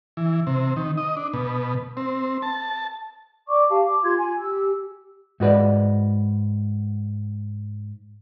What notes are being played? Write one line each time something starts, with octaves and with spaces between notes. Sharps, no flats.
E3
C3
D#3
D#5
D4
B2
C4
A5
D5 C#6 D6
G4 F5 A5
D6
F4 G4 C6 G#6
G#5
G4 E6
G#2 F#4 B4 D5